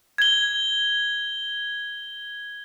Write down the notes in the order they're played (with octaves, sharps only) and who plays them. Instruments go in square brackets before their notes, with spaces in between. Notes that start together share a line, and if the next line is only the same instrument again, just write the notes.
[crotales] G#6 G7